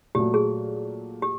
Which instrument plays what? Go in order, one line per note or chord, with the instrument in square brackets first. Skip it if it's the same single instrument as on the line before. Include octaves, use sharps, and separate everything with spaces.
[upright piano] A#2 F#3 A3 [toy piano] G4
[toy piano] G#4
G4